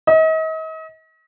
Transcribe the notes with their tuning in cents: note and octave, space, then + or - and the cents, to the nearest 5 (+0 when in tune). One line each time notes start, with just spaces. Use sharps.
D#5 +40